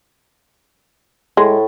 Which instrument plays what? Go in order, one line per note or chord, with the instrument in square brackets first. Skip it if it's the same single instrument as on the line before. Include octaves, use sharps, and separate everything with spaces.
[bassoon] A2 [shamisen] G#3